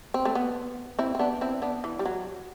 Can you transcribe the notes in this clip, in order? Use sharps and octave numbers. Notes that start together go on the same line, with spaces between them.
C4
A3
B3
C4 E4
C4
B3 D4
C4 E4
B3 D4
E3
G3
F#3